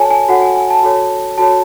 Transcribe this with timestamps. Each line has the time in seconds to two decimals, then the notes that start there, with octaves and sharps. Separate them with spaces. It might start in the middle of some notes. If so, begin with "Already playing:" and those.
Already playing: F#4 A4 C#5 G#5 A5
0.10 G#5
0.29 F#4 A4 C#5 F#5
0.42 G#5
0.56 G#5
0.70 A5
0.83 F#4 A4 C#5
1.38 F#4 A4 C#5 A5